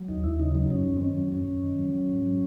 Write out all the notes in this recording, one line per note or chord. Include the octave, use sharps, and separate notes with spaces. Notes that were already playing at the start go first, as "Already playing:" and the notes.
Already playing: F#3
D#2 D#4
D#2 E4
C#3 D#4
F#3 D#4
F#2 C#4
F#2
C4
D#3 C#4
F#3
F#2 C#4
F#2
D#3
F#3
F#3
G#2
F#3